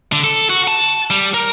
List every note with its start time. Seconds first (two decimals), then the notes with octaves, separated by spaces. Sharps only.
0.12 D3
0.24 A4
0.50 F#4
0.68 A5
1.10 G3
1.34 A#4